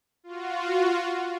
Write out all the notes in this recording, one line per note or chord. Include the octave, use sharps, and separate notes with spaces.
F4 F#4